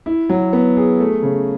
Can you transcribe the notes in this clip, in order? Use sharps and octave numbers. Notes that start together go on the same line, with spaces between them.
E4
F#3
B3
G#4
A3
C#3